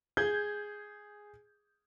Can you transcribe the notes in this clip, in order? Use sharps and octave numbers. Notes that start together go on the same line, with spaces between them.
G#4 G6 G#6